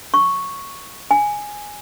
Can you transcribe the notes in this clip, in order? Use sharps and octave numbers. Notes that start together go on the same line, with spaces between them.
C#6
G#5